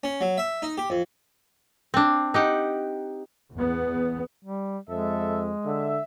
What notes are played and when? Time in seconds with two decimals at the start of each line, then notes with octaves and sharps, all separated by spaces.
0.04 C#4
0.21 F#3
0.38 E5
0.62 D#4
0.78 G4
0.90 F2
1.94 C4 D4
2.34 D#4 G4 F#5
3.54 E2 B3
4.45 G3
4.89 F2 G#3 A4 E5
5.65 D3 E5